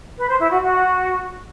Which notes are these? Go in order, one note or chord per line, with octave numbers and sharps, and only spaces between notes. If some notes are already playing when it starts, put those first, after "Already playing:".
B4
C5
E4
F#4
F#4